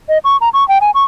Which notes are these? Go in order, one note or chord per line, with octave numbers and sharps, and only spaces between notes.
D#5
C#6
A#5
C#6
G5
G#5
C#6